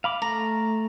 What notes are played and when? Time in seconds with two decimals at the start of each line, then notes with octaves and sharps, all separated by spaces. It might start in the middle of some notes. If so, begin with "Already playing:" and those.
0.04 F5 B5 D6
0.22 A3 A#5